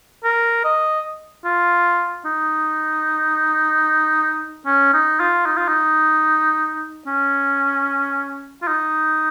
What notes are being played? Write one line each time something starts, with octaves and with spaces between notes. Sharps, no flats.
A#4
D#5
F4
D#4
C#4
D#4
F4
D#4
F4
D#4
C#4
F4
D#4